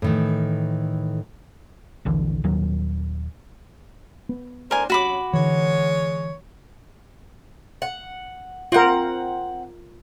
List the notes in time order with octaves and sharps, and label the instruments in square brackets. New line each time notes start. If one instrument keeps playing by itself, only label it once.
[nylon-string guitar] A2 D#3 E3
[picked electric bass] D#1 A#1 D3 E3
D#1 D#2 D#3 F#3
[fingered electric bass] B3
[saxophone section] A2 D4 C5 [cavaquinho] A#4 G#5
[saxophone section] C3 F#3 C#4 [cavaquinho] F#4 B5 D6
[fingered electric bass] D3 E3 [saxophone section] G#3 C#5
[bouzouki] F#5
[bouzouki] C4 F#5 [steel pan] F4 A#4